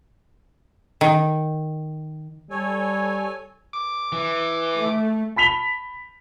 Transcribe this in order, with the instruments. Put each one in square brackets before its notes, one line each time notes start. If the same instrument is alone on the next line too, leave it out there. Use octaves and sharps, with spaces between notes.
[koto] D#3
[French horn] G3 [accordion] A4 C#5 G#5
[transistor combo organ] D6
[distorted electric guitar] E3
[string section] A3
[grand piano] A5 B5 B6 F7 G7